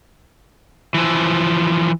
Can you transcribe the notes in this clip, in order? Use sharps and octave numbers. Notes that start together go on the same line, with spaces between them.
E3 F3